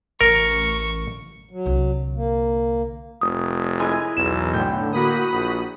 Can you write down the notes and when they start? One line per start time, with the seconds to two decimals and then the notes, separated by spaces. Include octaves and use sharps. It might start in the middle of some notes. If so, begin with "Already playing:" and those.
0.21 A1 A#4 C#6
1.51 F#3
1.66 C2 D3
2.16 A#3
3.21 F1 D#6
3.79 G#3 E4 A#4 G#5
4.17 B1 E2 E7
4.53 A2 D3 G5
4.93 A#3 F#4 B5 D#6
5.32 A#1